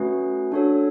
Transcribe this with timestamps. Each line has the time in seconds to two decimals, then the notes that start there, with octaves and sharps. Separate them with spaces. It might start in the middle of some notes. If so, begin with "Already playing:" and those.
Already playing: A3 C#4 F#4 B4
0.52 D4 F#4 A4 C#5